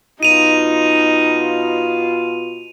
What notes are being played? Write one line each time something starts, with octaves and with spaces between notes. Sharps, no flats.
B2 D#4 F4 D#7 F7